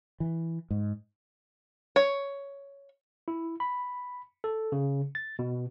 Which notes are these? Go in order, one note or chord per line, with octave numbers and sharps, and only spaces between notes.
E3
G#2
C#5
E4
B5
A4
C#3
A6
B2